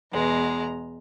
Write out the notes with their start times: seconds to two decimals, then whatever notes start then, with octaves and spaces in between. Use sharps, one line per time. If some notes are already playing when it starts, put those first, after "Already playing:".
0.12 E2 B2 G#3 A#5